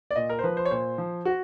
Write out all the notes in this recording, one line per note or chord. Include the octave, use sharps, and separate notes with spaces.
D5
A#2 D#5
A#4
C5
F3 B4
C5
C#5
A#2 C5
F3
F#4